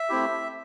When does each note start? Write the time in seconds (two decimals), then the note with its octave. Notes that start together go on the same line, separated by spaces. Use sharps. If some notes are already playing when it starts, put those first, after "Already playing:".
Already playing: E5
0.09 A3 C4 E4 G4